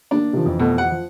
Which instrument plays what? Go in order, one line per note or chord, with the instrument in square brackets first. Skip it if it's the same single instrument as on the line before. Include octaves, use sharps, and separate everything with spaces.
[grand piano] A#3 [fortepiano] D4
[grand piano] C3 D#3 F3
F2 E3
[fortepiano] B2 A3
F#5
[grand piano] F3